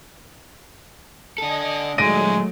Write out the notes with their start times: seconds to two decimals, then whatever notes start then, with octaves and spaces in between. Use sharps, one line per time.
1.38 D4 A4 D#5 G#5 D#6
1.98 A#2 D#3 F#3 G#3 A3 A#6 D7 D#7